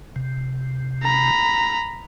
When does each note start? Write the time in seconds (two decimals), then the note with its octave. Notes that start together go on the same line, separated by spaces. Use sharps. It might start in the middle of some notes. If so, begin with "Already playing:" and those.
0.16 C3
1.03 A#5 B5